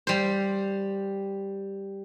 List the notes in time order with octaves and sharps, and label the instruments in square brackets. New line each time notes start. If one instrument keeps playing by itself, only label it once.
[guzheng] G3 C5